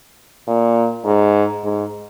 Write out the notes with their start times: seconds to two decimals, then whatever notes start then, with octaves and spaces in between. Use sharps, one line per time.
0.48 A#2
1.05 G#2
1.64 G#2